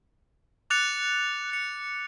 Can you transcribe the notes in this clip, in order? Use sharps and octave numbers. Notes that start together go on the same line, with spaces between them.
D6 F#6 A6 C#7 F7
F#6 A6 C#7 F7